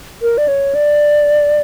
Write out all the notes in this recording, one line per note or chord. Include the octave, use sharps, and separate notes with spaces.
A#4
D5
C#5
D5